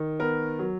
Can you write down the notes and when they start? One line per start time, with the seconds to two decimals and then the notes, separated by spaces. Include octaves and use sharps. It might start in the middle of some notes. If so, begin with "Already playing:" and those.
Already playing: D#3
0.19 B3 A#4
0.59 F#3